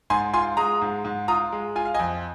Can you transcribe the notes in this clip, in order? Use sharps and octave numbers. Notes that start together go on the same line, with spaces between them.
G#2 G#5 C6
F4 G#5 C6
G#3 A#5 D#6
G#2
G#2
F4 A#5 D#6
G#3
F4 G#5
F5
D#5 G#5
F2